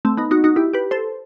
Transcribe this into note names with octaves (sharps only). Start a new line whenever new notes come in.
A3 C4
B3 D#4
D#4 F#4
D#4 F#4
E4 G4
G4 B4
A4 C5